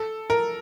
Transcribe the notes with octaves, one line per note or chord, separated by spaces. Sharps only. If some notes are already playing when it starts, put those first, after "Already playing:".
Already playing: A4
A#4